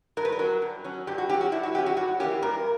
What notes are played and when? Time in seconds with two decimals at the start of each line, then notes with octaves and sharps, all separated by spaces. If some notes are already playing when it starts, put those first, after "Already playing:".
0.17 G2 A#4
0.25 B4
0.32 A#4
0.39 F#3 C#4
0.62 G2
0.84 F#3 C#4
1.07 G2 G4
1.18 F#4
1.29 C#4 G4
1.34 F#3
1.41 F#4
1.52 G2 E4
1.63 F#4
1.74 F#3 G4
1.78 C#4
1.86 F#4
1.97 G2 F#4
2.20 E3 A#3 C#4 G4
2.42 G2 A#4